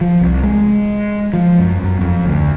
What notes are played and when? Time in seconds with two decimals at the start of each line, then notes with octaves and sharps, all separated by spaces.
0.01 F3
0.21 C2
0.43 G#3
1.33 F3
1.60 F#2
1.84 F#2
2.01 F2
2.26 D2